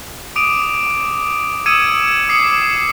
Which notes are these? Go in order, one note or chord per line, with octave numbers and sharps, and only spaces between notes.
D6 D#6 D7 D#7 F7
D#6 E6 G#6 C#7 D#7 E7
D6 D#6 C7 C#7